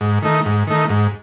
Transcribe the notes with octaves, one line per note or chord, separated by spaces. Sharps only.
G#2
D#3 A3 D#4
G#2
D#3 A3 D#4
G#2